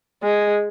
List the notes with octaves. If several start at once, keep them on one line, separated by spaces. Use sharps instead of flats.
G#3